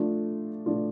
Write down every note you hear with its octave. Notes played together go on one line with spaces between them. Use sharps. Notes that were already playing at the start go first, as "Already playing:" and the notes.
Already playing: F3 A3 D4 F4
F3 A3 D4 F4